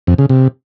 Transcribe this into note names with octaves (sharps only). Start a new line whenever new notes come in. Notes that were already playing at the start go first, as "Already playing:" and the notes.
F2
C#3
C3